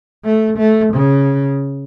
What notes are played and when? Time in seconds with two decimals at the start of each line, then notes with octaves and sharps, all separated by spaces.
0.24 A3
0.57 A3
0.93 C#3